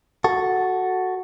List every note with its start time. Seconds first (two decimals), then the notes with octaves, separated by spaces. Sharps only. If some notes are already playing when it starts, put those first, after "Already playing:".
0.24 F#4 A4